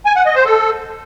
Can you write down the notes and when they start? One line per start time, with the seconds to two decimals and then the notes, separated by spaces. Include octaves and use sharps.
0.06 G#5
0.15 F#5
0.25 D#5
0.35 C5
0.45 A4